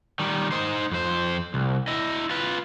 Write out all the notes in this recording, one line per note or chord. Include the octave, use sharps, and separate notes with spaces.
D#3 G3
D#4 C5
F2 C5
C2
E4 D#5
F4 B4